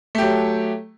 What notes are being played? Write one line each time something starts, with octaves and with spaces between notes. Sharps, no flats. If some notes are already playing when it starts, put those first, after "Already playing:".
F#3 A3 G4